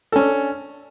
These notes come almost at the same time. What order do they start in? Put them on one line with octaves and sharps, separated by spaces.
A4 C#4 D4